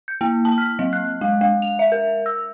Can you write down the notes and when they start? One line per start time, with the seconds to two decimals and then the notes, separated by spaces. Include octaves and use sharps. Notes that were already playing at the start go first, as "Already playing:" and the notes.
0.08 G6
0.21 A#3
0.45 A5
0.58 F6
0.79 F#3
0.93 F#6
1.21 G#3
1.41 G#3
1.62 F7
1.79 E5
1.92 A#4
2.26 E6